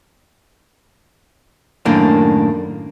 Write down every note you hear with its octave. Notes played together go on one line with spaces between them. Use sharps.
F#2 A2 D#3 A#3 D4